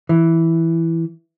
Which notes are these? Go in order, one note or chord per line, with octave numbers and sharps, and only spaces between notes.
E3